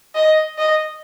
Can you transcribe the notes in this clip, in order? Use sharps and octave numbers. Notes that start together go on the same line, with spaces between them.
D#5
D#5